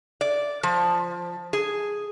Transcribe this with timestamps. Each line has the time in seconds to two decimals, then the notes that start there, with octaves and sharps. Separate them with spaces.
0.21 D5
0.63 F3
1.53 G#4